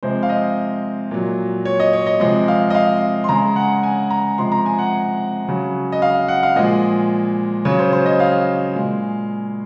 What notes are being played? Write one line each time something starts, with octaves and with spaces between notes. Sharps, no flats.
C3 F3 G#3 C5
F5
D#5
A#2 F#3
C#5
D#5
C#5
D#5
C3 F3 G#3 D#5
F5
D#5
F5
C6
C#3 G#3 A#5
F#5
G#5
A#5
C3 F3 G#3 C6
A#5
G#5
F#5
C#3 F#3
D#5
F5
F#5
F5
A#2 F3 G#3 D#5
C#3 F#3 C#5
C5
C5
D#5
F5
A#2 G#3